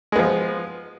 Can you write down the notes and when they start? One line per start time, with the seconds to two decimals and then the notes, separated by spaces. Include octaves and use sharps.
0.12 G#3
0.16 B3
0.19 F3